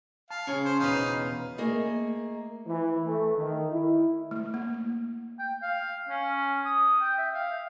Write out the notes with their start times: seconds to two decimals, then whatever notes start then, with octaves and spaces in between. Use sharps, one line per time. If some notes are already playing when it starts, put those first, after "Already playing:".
0.31 F5 A5
0.47 C#3 C#4 C#5
0.65 C5
0.80 E2 B2 D#4 B4 F5
1.58 A3 A#3 G#4 D#5
2.65 E3
3.05 A3
3.36 D#3
3.70 E4
4.31 A3
4.54 A#3
5.39 G5
5.62 F5
6.08 C#4
6.65 D#6
7.01 G5
7.18 E5
7.34 F5